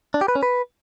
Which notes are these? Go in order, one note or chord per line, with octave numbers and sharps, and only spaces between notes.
D4
G4
B4
C#4
B4